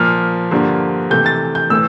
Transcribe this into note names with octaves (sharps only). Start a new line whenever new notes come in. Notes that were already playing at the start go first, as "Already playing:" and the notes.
Already playing: A#2 F3 A#3 F6
G2 D3 F3 A#3
C3 E3 A3 G6
A6
G6
A2 E3 A3 E6